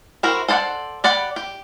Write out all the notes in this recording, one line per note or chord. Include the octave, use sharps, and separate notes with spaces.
E4 F#4 A#4 C5 E5
A4 C5 D5 F5 F#5
G4 D5 F#5 B5
G4